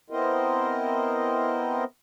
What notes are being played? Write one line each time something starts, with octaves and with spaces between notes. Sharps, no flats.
B3 C4 E4 A#4 C5 D#5